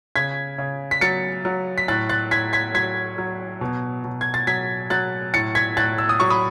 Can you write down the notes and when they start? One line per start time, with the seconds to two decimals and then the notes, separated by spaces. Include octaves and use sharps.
0.16 C#3 G#6 B6
0.58 C#3
0.91 B6
1.01 F#3 A6 C#7
1.45 F#3
1.78 B6
1.88 A2 F#6 A6
2.09 F#6 A6
2.31 A2 G#6 B6
2.53 G#6 B6
2.74 F#3 G#6 B6
3.18 F#3
3.61 B2
4.04 B2
4.21 G#6
4.34 A6
4.47 F#3 G#6 B6
4.90 F#3 F#6 A6
5.34 A2 A6 C#7
5.55 G#6 B6
5.77 A2 F#6 A6
5.98 E6
6.09 D#6
6.20 F#3 C#6
6.30 B5 D#6